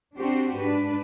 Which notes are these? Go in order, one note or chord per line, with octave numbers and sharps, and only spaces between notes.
C4 D4 F#4 G4 C5
G#2 D4 B4